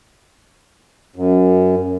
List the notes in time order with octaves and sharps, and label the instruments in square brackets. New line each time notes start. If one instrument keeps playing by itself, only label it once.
[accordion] F#2